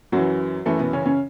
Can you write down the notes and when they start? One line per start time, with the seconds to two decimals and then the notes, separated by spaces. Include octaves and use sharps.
0.12 F#2 E3 F#3 F#4
0.66 F#2 E3 A3
0.79 B2 B3
0.93 C#3 C#4
1.06 C#3 C#4